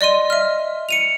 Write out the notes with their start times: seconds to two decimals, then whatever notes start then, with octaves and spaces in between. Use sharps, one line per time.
0.01 D5 D#5 C6 D#7
0.30 E5 F6
0.89 C#7 D#7 F7